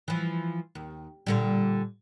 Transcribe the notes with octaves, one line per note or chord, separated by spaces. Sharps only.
E3 F3
D#2
A#2 D3 G3